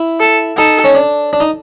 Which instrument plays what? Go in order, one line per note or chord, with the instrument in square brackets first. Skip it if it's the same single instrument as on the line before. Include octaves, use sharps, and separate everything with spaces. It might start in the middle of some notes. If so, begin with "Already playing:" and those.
Already playing: [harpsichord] E4
[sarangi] A4
[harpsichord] D#4 [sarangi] A4
[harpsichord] C#4
D4
D4
D#4